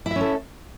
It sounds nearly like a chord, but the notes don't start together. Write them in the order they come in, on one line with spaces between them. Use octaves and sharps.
E4 E5 C#4 A4